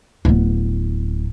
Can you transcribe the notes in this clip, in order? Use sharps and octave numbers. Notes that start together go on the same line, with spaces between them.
D1 B3